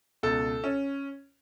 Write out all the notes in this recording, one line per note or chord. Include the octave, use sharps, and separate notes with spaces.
C#2 B2 A4
C#4